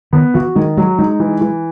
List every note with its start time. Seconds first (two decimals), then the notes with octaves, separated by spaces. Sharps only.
0.13 D#3 B3
0.34 E3 F#4
0.55 D#3 G#3
0.77 F#3 G#3
0.98 G#3 D#4
1.20 E3
1.41 E3